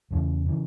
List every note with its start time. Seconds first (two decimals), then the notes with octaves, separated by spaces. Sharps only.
0.11 E2 C#3 E3
0.46 C#3 E3